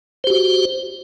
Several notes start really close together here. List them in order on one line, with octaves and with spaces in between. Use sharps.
C5 G4 F#4